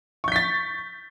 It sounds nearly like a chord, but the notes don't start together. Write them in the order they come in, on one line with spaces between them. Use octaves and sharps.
C#6 G6 B6 A6